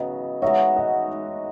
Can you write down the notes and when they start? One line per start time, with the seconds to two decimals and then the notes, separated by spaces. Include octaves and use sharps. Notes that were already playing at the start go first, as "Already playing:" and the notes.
Already playing: C#3 F#3 B3 E4 D#5
0.42 G#3 D#4 F#4 C#5 E5
0.76 D#5 F#5